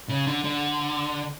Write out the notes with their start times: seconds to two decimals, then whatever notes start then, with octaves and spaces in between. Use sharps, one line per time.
0.09 C#3
0.27 D3
0.44 D3